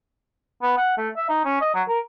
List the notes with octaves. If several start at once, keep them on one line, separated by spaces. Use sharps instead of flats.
B3
F#5
A3
E5
D#4
C#4
D#5
F#3
A#4